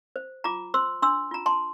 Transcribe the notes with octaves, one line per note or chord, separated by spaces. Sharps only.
C5
F4 A#5 D6
C5 C6 E6
D4 C6 E6
F4 A#5
A5 C6